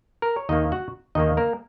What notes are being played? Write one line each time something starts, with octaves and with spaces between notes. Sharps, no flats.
A#4
C#5
D#2 D#3 A#3 D#4 D#5
F#4 F#5
D#2 D#3 A#3 D#4 D#5
A#3 A#4